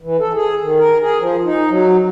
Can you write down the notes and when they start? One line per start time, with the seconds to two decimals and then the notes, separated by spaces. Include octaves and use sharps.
0.02 E3
0.20 A4
0.35 G#4
0.62 D#3
0.79 A#4
1.02 G#4
1.19 F3
1.45 D#4
1.70 F#3